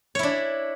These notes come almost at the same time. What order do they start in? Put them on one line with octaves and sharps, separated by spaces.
C#5 E4 D4